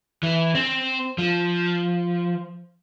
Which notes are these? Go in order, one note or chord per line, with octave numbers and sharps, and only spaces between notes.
E3
C4
F3